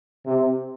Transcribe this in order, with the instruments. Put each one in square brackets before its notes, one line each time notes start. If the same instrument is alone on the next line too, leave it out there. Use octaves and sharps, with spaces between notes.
[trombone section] C3